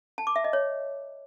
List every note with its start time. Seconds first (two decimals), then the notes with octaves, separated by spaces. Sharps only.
0.18 A5
0.27 D6
0.36 E5
0.44 D#5
0.53 C#5